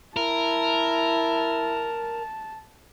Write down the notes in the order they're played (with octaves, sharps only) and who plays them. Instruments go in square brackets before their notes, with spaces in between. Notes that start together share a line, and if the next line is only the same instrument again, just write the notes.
[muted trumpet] E4 [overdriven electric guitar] A#4 [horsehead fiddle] A5